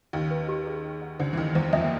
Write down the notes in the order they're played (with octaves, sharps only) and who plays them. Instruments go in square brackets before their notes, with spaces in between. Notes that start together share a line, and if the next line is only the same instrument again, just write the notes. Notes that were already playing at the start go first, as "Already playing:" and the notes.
[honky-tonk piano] D#2 D#3 [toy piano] G4
[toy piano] B4
G4
G#4
G#4
F#5
[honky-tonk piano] D2 D3 [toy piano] C5
[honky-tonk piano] E3
[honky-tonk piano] D#2 D#3 [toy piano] G5
[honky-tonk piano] E2 E3 [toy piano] C5
[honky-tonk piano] F2 F3 [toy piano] E5
[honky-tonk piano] A#3